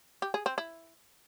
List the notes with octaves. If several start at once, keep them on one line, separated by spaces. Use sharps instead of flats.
G4
G#4
C4
E4